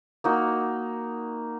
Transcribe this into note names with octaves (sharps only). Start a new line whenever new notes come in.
A#3 D#4 F#4